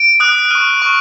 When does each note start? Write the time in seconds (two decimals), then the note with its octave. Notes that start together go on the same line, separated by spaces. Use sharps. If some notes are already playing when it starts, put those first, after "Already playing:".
Already playing: D7
0.20 D#6 F#6
0.50 C#6 F6 D#7
0.82 C#6